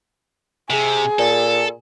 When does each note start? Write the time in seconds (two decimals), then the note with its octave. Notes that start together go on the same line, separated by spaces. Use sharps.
0.70 C3 G#4
1.19 A#2 A4